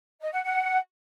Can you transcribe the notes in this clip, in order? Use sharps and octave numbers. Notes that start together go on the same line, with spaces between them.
D#5
F#5
F#5